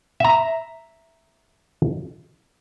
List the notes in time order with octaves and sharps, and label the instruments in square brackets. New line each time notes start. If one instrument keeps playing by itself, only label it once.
[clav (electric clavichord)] E5 A#5